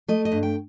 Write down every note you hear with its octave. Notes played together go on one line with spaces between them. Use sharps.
A3 D#5
D#5
G2
G5